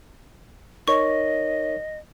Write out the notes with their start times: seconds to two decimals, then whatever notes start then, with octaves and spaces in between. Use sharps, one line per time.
0.88 D#4 A#4 C#5 D#5 C#6